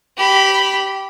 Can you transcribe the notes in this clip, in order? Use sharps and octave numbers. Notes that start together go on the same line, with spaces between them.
G4 B5